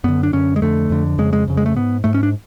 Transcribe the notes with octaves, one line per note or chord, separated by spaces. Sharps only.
F#2 D3 B3
D4
F#2 D3 C#4
G#3
F2 D3 A3
F2 D3
F2 C#3 G#3
G#3
F2 C#3
G#3
A3
G#2 B3
G#2 A3
C#4
D4